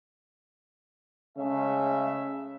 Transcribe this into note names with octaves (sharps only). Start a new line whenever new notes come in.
C#3 G#3 A3 C#4 E5